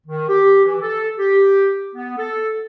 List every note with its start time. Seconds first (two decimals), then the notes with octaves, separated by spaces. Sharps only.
0.06 D#3
0.29 G4
0.65 E3
0.81 A4
1.19 G4
1.94 B3
2.17 A4